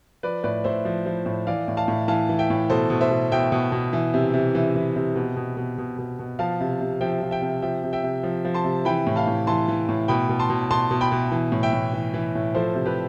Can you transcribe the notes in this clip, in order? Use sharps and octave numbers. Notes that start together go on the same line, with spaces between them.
F3 B4 D5
A2 B4 D5
A2 C5 E5
F3
F3
A2
E3 D5 F5
A2
F5 A5
A2
E3 F5 A5
E3
E5 G5
A2
B2 A4 C5
B2
C5 E5
B2
B2 E5 G5
B2
B2
E3
C3
C3
E3
E3
C3
B2
B2
B2
B2
B2
B2
F3 F5 A5
C3
C3
F3 E5 G5
F3
E5 G5
C3
F3 E5 G5
C3
E5 G5
C3
F3
F3
A5 C6
C3
E3 G5 B5
A2
F5 A5
A2
E3 A5 C6
E3
A2
B2 G5 B5
B2
A5 C6
B2
B2 A5 C6
B2
G5 B5
B2
E3
A2
E5 G5
A2
E3
E3
A2
F3 A4 C5
C3
G4 B4